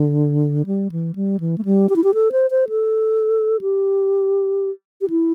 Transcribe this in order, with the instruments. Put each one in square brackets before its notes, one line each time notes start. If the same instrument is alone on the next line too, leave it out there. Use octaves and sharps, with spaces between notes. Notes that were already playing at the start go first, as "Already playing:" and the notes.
Already playing: [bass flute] D3
G3
E3
G3
E3
A3
G3
G4
E4
G4
A4
C5
C5
A4
G4
G4
E4